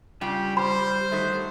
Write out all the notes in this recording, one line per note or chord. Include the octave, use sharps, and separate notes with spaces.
C#3 G3 F4 G4 G5
C5 B5
D#3 F#3 A3